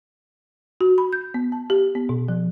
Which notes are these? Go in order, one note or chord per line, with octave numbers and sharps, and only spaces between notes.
F#4
B5
G6
B3
A5
G4
B3
B2
F3